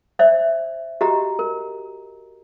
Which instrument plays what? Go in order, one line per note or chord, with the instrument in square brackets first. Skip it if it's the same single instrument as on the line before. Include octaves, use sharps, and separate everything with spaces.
[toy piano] C5 D5 E5
F#4 G4 D#5 A#5
A#4